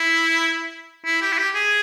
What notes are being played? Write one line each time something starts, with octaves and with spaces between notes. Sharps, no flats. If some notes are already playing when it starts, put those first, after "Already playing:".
Already playing: E4
E4
G4
E4
G4
G#4